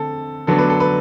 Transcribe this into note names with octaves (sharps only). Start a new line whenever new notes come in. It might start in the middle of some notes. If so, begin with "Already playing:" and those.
Already playing: D3 C4 A4
D3 F#3 B3 D4 A4
B4
A4
B4